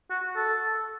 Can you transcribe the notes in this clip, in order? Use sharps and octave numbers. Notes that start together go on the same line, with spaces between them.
F#4
A4